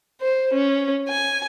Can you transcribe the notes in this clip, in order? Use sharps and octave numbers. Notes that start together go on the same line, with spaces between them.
C5
C#4
G#5